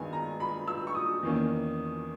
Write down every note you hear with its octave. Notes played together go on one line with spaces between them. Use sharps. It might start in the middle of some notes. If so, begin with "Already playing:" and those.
Already playing: G2 D#3 G#3 B3 G#5
A#5
B5
E6
C#6
D#6
E2 D#3 A#3 C#4